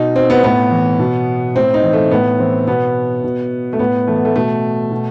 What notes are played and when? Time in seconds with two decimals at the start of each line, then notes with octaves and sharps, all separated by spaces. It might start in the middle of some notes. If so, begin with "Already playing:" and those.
Already playing: B2 D#4
0.16 C4
0.30 B3
0.43 A2 B3
0.71 E3
0.99 B2
1.55 A2 C4
1.74 D#4
1.84 E3
1.93 A3
2.11 A2 B3
2.40 E3 C4
2.68 B2 B3
3.24 B2
3.73 A3
3.79 A2 B3
4.07 E3 A3
4.16 B3
4.25 A3
4.35 B2 A3
4.92 B2